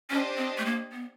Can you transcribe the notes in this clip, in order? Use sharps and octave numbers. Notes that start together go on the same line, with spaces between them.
C#4 D4 G4 C5 D#5
C4
A3
A#3
B3